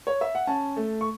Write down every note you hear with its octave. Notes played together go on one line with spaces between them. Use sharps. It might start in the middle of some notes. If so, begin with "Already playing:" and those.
C#5
E5
F#5
C#4 A5
A3
C#6